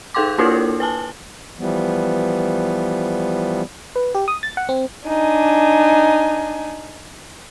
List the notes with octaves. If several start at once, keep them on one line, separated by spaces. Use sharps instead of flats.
D#4 G#4 A4 G5 C6 D6
A#3 D4 E4 F4 A4 A#4
B4 G#5 A5
E3 F3 G3 B3
B4
G4
D#6
A6
F#5
C4
D4 D#4 G#5